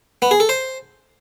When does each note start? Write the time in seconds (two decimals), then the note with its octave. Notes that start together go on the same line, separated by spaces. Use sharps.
0.22 B3
0.31 G#4
0.40 A4
0.49 C5